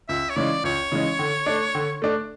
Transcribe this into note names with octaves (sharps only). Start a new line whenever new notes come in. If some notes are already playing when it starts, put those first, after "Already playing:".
C#2 E5
C#5
C#3 E3 G#3 C#4 D5
C#2 C#5
C#3 E3 G#3 C#4
D3
A3 D4
D3
A3 D4